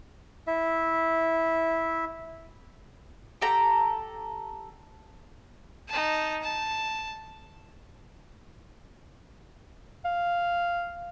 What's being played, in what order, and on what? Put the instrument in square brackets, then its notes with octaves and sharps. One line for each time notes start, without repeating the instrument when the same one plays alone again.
[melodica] E4 E5
[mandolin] G4 A4 A#5
[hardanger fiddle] D#4 A5
A5
[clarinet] F5